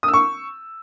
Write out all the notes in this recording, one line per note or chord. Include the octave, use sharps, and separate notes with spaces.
D#6
E6
C#6